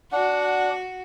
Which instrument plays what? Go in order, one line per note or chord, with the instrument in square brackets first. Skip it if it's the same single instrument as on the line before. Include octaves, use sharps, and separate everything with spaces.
[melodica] D4 [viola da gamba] F#4 [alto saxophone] F#5